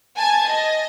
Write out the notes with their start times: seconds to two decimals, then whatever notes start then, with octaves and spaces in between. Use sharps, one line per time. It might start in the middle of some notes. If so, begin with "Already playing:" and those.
0.16 G#5 A5 G#6
0.47 D#5